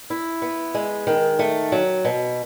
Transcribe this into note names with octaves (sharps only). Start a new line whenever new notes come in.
E4
B3
G#3
D#3
A3
F#3
B2